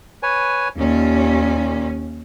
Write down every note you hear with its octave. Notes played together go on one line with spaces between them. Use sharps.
B4 C#5 G#5
D#2 A#2 C#4